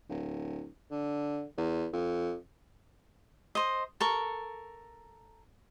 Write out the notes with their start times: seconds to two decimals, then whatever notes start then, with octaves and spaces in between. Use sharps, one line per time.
0.09 D1
0.91 D3
1.58 E2
1.93 F2
3.55 C5 D#5
4.00 A4 A#4 C#6